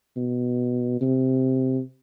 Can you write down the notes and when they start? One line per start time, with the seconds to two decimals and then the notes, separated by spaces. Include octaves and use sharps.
0.17 B2
1.01 C3